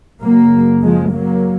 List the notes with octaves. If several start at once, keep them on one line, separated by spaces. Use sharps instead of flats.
F#2 C#3 F#3 A#3
F3 G#3
F#3 A#3